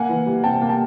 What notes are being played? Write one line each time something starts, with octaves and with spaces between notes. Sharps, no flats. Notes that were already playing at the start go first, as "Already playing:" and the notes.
Already playing: A#3 F#5 G#5
E3
G3
C3 G5 A5
A#3
G5 A5